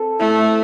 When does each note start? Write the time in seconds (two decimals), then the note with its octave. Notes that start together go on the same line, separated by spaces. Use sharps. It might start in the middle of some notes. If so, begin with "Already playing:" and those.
Already playing: C4 A4
0.19 A3 E4